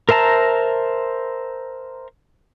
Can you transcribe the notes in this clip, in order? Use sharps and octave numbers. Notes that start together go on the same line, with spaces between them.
A#4 C5 E5 A5 A#5